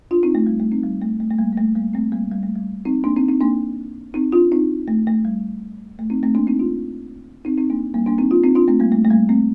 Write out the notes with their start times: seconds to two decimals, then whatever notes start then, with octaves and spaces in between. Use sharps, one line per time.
0.11 D4 F4
0.23 C4 D#4
0.35 A3
0.47 G3
0.60 A3
0.72 C4 D#4
0.83 G3
1.02 A3
1.20 A3
1.31 A3
1.38 G3 A#3
1.53 A#3
1.57 A3
1.75 G3 A#3
1.94 A3 C4
2.12 G3 A#3
2.31 G3
2.43 A3
2.56 G3
2.85 C4 D#4
3.04 A#3 D4
3.16 C4 D#4
3.29 C4 D#4
3.41 A#3 D4
4.14 C4 D#4
4.32 D4 F4
4.52 C4 D#4
4.88 A3
5.07 A3
5.25 G3
5.99 A3
6.10 C4 D#4
6.23 A3 C4
6.35 A#3 D4
6.47 C4 D#4
6.59 D4 F4
7.45 C4 D#4
7.58 C4 D#4
7.70 A#3 D4
7.94 G3 A#3
8.06 A#3 D4
8.18 C4 D#4
8.31 D4 F4
8.44 C4 D#4
8.55 D4 F4
8.68 A3 C4
8.80 G3 A#3
8.92 A3
9.05 A3
9.10 G3 A#3
9.29 A3 C4